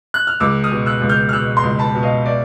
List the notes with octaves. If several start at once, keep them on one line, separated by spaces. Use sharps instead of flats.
F#6
F6
C#2 D6 E6
D#6 F6
B2
E6 F#6
C#2
F6 G6
F6
B2 E6 F#6
A#5 C6
C#2
A5 B5
B2
D#5 F5
D5 E5